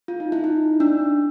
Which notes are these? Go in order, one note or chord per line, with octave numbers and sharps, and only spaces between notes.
F4
D#4
E4
D#4
D4